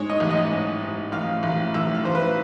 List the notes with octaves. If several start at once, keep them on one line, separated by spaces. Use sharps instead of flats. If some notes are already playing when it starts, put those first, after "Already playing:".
Already playing: G#2 C#5
D#5
A1
D#5
G#2
G#2
A1 F5
A1
A1 E5
F5
A1 C5
B4